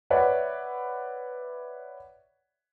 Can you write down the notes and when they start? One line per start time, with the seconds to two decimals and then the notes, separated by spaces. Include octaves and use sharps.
0.10 B4 C#5 D5 E5 F#5